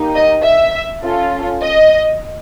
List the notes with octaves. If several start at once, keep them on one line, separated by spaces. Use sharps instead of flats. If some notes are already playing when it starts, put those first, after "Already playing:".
Already playing: A#3 D#4 G4
D#5
E5
C#4 F4 A4
D#5